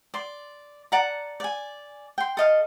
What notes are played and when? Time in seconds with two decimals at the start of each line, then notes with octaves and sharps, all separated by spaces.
0.14 D5 C6
0.92 D5 F#5 A5 A#5
1.40 D5 G#5
2.18 G5 C6
2.37 A4 D#5 F5